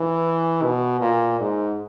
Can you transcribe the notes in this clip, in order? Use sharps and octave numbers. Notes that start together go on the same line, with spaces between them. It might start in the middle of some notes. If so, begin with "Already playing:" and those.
Already playing: E3
B2
A#2
G#2